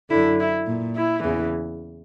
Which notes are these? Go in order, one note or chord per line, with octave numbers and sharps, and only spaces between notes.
F#2 D3 E4
E4
A#2
E4
E2 C#3 E3